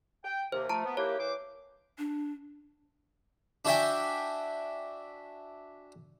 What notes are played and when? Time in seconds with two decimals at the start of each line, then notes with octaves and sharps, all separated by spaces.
0.24 G5
0.52 D#2 C3 C5
0.69 F3 A3 A5 A#5
0.85 B3
0.97 A#3 E4 G4 C#5
1.19 E3 C5 D6
1.98 D4
3.65 D4 E4 F#4 E5 G5 G#5